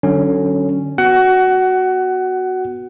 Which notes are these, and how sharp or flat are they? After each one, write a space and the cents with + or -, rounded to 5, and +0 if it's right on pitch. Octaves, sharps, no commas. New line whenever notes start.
D3 +20 F#3 +30 C#4 +0
B3 +0 F#4 +0 F#5 +20